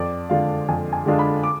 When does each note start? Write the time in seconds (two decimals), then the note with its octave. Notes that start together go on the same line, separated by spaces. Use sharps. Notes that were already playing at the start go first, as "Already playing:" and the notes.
Already playing: F2 D5
0.30 D3 G#3 D4 F4 F5
0.68 F2 G#5
0.93 G#5
1.06 D3 G#3 D4 F4
1.19 B5
1.43 D6